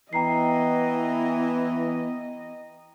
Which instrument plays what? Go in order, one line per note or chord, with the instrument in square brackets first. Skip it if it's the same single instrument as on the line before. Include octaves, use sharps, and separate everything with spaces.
[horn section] E3 [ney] B3 [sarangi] D#5 [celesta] G5 A#5 C7